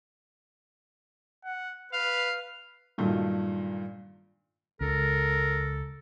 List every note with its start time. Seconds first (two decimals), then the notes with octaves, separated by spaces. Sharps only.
1.45 F#5
1.93 B4 F5
2.98 G2 A#2 D#3 F#3 A3
4.81 C#2 A4 A#4